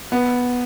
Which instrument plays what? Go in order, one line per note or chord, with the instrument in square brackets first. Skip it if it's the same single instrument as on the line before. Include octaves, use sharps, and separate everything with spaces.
[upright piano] B3